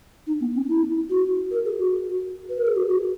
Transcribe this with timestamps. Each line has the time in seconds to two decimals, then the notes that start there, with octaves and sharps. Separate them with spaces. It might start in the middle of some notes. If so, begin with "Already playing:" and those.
0.27 D#4
0.40 B3
0.54 C#4
0.68 E4
1.10 F#4
1.51 A#4
1.65 G#4
1.78 F#4
2.49 B4
2.58 A#4
2.67 G#4
2.76 F#4
2.89 F#4